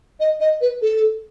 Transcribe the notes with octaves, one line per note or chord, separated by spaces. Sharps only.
D#5
D#5
B4
A4